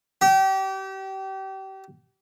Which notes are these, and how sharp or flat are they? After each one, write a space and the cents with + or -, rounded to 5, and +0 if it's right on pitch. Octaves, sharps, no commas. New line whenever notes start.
G4 -30